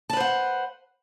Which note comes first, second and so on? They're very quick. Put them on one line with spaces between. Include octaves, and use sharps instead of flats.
A5 B4 C5 F#5